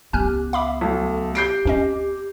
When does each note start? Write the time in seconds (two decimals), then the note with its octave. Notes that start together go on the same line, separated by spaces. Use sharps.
0.13 C#2 B3 G4 G#5 F6 F#6
0.53 E5 F5 B5 D6
0.81 B1 A3
1.35 G4 G6 C7 D7
1.65 D2 C4 C#4 D#5